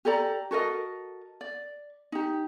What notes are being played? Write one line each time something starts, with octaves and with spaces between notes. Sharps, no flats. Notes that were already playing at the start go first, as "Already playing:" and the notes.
G4 A4 D5 A#5
F#4 A4 A#4 D#5
D5
D#4 G4